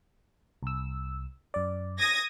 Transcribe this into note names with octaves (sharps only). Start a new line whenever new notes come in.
C2 E6
F#2 D5
D#6 G#6 A#6